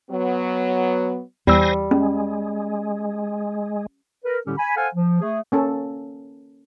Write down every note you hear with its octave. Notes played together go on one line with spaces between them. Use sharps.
F#3 B3
E2 G3 C5 G#5 E6 A#6
G#3 C#4
A#4 B4
A2 D3 G3 C#4 G4 A4
G#5 B5
A4 C5 F5 F#5 G#5
F3
A3 G#4
A#3 C#4 A4